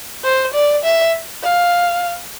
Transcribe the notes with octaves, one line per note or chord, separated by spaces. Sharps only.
C5
D5
E5
F5